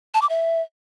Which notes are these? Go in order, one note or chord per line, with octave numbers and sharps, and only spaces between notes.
A5
D6
E5